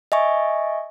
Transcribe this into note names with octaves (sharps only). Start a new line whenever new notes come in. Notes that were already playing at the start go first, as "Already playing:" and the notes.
D#5 E5 G#5 C#6